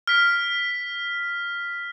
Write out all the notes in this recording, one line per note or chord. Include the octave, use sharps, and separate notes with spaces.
F6 B6